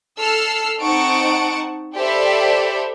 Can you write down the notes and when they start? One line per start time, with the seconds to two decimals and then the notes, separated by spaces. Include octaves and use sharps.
0.17 A4 E6 F6 C7
0.80 C4 D#4 F#5 A5 C#6 D7
1.94 G4 A4 C5 D5 E5 B5